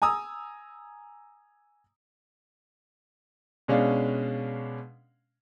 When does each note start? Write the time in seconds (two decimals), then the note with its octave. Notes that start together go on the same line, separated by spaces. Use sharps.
0.02 G#5 A#5 D#6 E6
3.68 B2 G#3 C#4 D4 F5